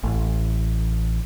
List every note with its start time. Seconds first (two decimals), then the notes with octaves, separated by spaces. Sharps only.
0.04 A1